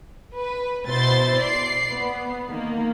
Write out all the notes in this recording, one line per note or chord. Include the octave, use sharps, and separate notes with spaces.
B4
B2 E4 C5 C6 A6
D5 C7
B3
D#3 A#3